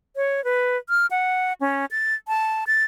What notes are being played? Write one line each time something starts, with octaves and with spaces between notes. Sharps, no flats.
C#5
B4
F6
F#5
C#4
A6
A5
A6